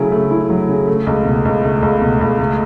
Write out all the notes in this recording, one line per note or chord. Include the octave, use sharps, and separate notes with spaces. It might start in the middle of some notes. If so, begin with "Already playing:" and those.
Already playing: C#3 F#3 A3 E4
A3
E4
F#3
C#3
A3
C#2
B2
C#2
A3
C#2
B2
C#2
A3